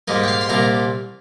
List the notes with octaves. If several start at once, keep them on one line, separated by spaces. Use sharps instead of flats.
G#2 G3 A#3 D#5
G5
F5
C6
C2 A#2 G3 A#3 A#5